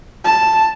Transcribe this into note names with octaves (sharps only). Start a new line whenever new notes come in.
A5